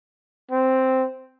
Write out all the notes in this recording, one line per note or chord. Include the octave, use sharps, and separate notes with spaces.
C4